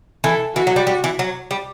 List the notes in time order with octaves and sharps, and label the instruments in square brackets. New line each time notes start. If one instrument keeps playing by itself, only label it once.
[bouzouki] E3 [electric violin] A4
[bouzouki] E3 [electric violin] F#4
[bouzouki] F#3
G3
G3
E3
F#3
G3